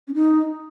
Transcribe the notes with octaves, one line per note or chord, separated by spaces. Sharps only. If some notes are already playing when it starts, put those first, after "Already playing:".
C#4
D#4